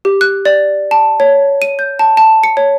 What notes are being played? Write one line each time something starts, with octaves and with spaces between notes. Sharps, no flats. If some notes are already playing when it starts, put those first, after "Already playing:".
G4
F#6
D5
A5
C#5
D#7
G6
A5
A5
C#7
C#5